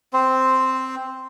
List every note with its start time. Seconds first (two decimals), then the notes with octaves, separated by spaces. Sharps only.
0.13 C4 C5